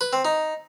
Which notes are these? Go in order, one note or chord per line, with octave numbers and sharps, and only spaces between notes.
B4
C4
D#4